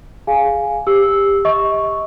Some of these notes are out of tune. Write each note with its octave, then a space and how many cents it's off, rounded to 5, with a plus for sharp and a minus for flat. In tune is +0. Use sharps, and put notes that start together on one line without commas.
G#4 +0 F5 +0 G#5 +0
G4 +20 E6 -5
D#5 +35 C#6 +0